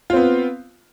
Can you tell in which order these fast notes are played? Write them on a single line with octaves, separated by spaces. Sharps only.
F4 C4 B3